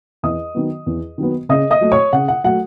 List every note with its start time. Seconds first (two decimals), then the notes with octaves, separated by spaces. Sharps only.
0.23 E2 D#5 D#6
0.55 D#3 F#3 B3
0.86 E2
1.18 D#3 F#3 B3
1.49 C#3 D#5 D#6
1.71 D#5 D#6
1.81 F#3 A3
1.92 C#5 C#6
2.13 C#3 F#5
2.28 F#5
2.44 F#3 A3 F#5